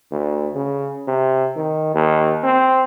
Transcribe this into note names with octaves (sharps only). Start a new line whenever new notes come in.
D2
C#3
C3
D#3
D#2
C4